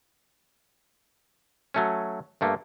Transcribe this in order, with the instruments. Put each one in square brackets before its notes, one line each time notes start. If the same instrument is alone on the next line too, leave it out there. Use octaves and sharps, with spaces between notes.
[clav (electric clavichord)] F#3 A3 C#4
G2 A3 A#3